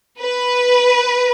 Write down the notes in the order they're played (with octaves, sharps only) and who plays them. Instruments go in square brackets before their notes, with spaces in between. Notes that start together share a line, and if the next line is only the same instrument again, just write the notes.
[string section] B4